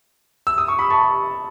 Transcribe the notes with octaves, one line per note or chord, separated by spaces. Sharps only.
E6
D#6
C#6
B5 D#6
A5 C#6